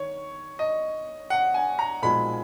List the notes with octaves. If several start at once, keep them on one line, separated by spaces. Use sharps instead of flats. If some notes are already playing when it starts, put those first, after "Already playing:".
Already playing: D#3 C#5
D#5
F#5
G#5
A#5
B1 A#2 F3 G#3 B5